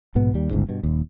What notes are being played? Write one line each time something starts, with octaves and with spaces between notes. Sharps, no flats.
A#1 G#2 B2 B3
D#2 G3
G1 C#2 G#2
G2 B2
D#1 D#2